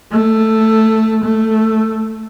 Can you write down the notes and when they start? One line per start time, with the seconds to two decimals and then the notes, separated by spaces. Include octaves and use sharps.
0.11 A3
1.24 A3